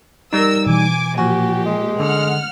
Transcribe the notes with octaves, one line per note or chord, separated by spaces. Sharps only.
G3 D#4 A#4 E6
B2 E3 G#5 D6
A#2 F3 F#4 G4 G#5
G#3
D3 F#5 F6